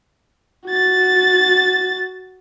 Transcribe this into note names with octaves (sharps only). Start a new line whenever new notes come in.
F#4 A6